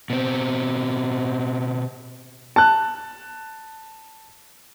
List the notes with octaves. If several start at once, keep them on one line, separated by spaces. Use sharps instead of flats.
B2 C4
A5 F#6